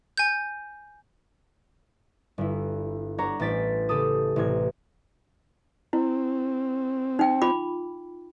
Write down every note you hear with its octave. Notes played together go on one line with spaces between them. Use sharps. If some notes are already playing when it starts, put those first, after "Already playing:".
G#5 G6
G1 E4
D4 C#5 F#5 A#5
A1 C#4 C5 A6 B6 D7
C#3 G4 A4 D#6
A1 C3 G#6
C4 E4
D#4 G5
F4 B5 D6